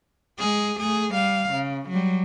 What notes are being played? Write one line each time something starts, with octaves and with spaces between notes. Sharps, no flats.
G#3 G#4
A3 G#4
G3 F5
C#3
F#3 G3